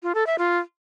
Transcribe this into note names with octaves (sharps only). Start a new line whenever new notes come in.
F4
A4
E5
F4